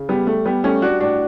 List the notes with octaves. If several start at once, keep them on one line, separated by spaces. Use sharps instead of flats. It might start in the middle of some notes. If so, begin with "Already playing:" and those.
Already playing: C#3
G3 B3
G3 A3
G3 B3
G3 A3 C#4
G3 D4 F#4
A2 D4 F#4